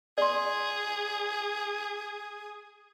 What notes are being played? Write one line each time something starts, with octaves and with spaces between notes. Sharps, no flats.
G#4 D5 C6